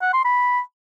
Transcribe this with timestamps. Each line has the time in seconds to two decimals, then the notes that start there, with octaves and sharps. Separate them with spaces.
0.02 F#5
0.13 C6
0.25 B5